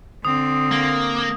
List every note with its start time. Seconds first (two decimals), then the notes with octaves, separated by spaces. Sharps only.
0.25 D3 C4 D#6
0.72 A#3